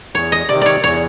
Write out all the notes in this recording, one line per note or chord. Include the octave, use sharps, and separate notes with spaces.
E2 C#5
D#5
C3 D#3 D5
C#5 D5
E2 C#5